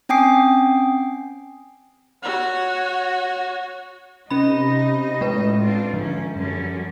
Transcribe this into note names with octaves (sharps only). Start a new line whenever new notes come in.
C4 C#4 G5 G#5 D#6 C7
F#4 C#5
C3 C#4 D#4 D#5 B5
A2 G#3 B4
C4 D4 F4
G#2 D3 F3 C#4
F#2 D3 G3 C#4